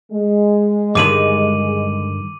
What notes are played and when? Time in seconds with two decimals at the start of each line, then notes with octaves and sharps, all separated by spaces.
0.11 G#3
0.95 G2 D3 D#3 D6 D#7 F#7